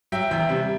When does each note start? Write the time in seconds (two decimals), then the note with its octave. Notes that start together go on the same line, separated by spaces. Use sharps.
0.12 F#3 E5 G5
0.31 E2 E5 G5
0.49 C3 G3